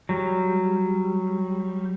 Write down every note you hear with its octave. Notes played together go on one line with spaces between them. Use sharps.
F#3 G3